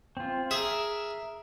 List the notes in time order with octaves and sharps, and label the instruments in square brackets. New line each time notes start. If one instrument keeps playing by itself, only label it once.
[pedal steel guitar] C4 F4
[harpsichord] G#4 [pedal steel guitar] A#4 E5